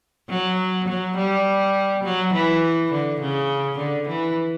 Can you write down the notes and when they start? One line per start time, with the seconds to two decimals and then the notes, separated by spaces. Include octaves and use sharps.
0.29 F#3
0.88 F#3
1.17 G3
2.04 F#3
2.34 E3
2.92 D3
3.20 C#3
3.78 D3
4.08 E3